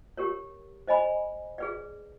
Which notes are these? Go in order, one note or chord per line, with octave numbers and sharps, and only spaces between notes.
G4 A#4 C#5
C5 D#5 G#5 B5
G#4 B4 D5